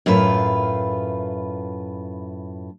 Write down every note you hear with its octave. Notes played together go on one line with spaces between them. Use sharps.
F#2 A2 F4 B4